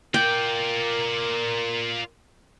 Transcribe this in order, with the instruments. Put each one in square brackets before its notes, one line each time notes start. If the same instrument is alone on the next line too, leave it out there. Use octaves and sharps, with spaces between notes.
[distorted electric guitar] F4 D5 [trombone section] A#4 [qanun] G5